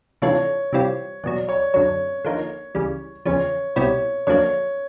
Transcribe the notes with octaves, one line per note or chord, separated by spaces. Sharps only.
C3 E3 A3 D4 F4 C#5
C3 E3 G3 C4 F4
E2 B2 F#3 D5
C#5
F#2 D3 F#3 C#5
D3 F3 A#3 D#4
C#2 C#3 E3 G3
E2 C#3 F3 C#5
C2 B2 G3 C4 E4 C#5
F2 D3 F#3 A#3 D4 C#5